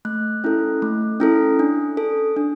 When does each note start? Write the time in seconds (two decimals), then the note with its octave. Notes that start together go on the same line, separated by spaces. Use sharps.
0.05 A3 F#6
0.44 C#4 E4 A4
0.82 A3
1.20 C#4 E4 A4
1.59 D4
1.97 A4
2.36 D4